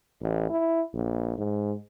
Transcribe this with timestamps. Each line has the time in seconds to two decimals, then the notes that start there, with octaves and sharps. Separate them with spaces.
0.21 A1
0.50 E4
0.94 A#1
1.38 G#2